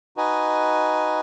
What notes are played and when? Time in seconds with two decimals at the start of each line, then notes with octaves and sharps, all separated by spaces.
0.17 D#4 F#4 B4 D#5 G#5